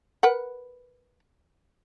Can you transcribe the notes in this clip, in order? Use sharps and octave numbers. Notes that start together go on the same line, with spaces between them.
A#4 B4 F#5